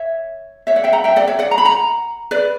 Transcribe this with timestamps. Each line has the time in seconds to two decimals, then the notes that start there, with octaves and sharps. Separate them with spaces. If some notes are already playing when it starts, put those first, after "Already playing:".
Already playing: C#5 E5
0.67 C#5 E5
0.76 D5 F#5
0.84 E5 G5
0.93 F#5 A#5
1.04 E5 G5
1.16 D5 F#5
1.27 C#5 E5
1.39 D5 F#5
1.51 A#5
1.58 B5
1.65 F#5 A#5
2.31 B4 D5